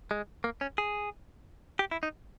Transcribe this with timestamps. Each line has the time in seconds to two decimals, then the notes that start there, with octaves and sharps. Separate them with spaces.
0.11 G#3
0.44 A#3
0.61 C#4
0.78 G#4
1.79 G4
1.91 E4
2.03 D#4